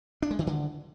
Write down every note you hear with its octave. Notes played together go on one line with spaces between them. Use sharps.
D4
G#3
D#3
D3